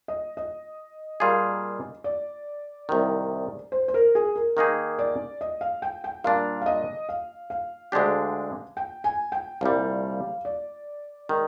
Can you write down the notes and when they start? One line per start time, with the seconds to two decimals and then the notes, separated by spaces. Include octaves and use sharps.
0.08 D#5
0.37 D#5
1.20 A#2 G3 A#3 F4 G#4
2.04 D5
2.89 C2 C3 D#3
3.72 C5
3.88 C5
3.94 A#4
4.15 G#4
4.36 A#4
4.57 D#3 A#3 D#4 G#4
4.99 D5
5.41 D#5
5.61 F5
5.82 G5
6.04 G5
6.24 A#2 G3 D4 F5
6.62 F5
6.66 D#5
7.09 F5
7.50 F5
7.92 D2 D3 G#3 D4 G4
8.77 G5
9.04 G#5
9.32 G5
9.61 C2 A#2 G3 F5
10.45 D5
11.29 D#3 G#3